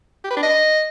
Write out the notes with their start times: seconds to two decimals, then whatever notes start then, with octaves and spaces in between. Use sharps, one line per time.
0.24 G4
0.30 B4
0.37 D4
0.43 D#5